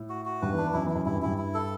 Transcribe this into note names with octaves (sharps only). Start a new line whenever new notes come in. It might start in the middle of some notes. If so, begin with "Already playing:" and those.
Already playing: A2
F#4
F#4
G2 B4
E2
D4
E2
F#2 E4
E2
E4
F#2
G2 E4
F#2
G2 E4
E4
A4